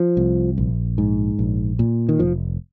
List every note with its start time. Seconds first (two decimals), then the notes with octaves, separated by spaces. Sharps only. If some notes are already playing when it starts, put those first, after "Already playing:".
Already playing: F3
0.17 C2
0.58 A#1
0.98 G#2
1.39 A#1
1.79 A#2
2.09 D#3
2.19 F1 F3